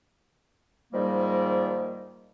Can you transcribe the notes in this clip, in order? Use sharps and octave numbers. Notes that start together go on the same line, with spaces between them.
G#2 D#3 F3 G3 A#3